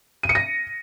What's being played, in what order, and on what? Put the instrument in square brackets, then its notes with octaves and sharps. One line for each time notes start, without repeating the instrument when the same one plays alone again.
[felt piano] D#7
C#7
A#6